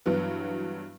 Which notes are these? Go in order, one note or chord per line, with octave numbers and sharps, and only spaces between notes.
G2 E3 F#3 B3